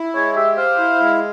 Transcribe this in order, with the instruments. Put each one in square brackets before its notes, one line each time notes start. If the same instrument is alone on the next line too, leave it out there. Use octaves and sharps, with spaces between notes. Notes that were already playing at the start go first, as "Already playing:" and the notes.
Already playing: [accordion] E4
[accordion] G#3 [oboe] C#5
[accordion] G4 [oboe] E5
[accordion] C5 [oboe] F5
[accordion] E4
G#3